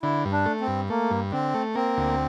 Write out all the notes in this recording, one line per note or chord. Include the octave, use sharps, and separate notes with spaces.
D3 E4
G2
D4
A3
C4
G2
A3 A#3
G2
D3 C4
A3
A#3 C4
D2